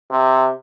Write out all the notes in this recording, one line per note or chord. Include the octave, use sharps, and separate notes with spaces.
C3